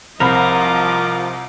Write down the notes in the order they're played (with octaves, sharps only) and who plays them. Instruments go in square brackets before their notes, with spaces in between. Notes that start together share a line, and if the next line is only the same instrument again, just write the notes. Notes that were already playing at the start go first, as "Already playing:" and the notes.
[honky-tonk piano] C2 B5 [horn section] F3 [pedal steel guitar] A#4 [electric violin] D#5 D6